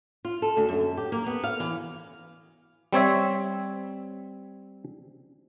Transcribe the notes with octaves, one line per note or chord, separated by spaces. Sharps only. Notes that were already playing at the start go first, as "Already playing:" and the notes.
F4
A4
D2
F#2
G4
A#3
B3
F5
E3
G3 C4 C#5 E5